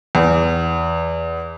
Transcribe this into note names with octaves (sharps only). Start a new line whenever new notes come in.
E2